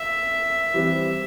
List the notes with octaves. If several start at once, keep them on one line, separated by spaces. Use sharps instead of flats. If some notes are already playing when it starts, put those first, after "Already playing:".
Already playing: E5
E3 G3 C4 E4 G4